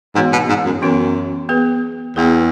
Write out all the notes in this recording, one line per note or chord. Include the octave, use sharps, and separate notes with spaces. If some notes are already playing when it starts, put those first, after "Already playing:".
G#2 E3 B3 F#4 C#5
B2
G#2
F#2
F#2 E3 B3 F#4 C#5
B3 G#4 B4
E2 B3 G#4 B4